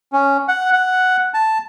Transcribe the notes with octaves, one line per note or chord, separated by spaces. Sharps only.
C#4
F#5
F#5
A5